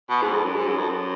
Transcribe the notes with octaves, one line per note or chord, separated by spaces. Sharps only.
B2
G#2
F2
F#2
G#2
F#2
F2
F#2